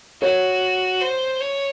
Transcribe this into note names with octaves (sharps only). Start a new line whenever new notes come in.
F#4 C#5
C5
C#5